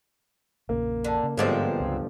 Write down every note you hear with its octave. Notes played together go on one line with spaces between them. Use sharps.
A#1 F2 C#3 A#3
D3
C#3
G1 G#2 F3 F#3 G#3 C4 D5
C#2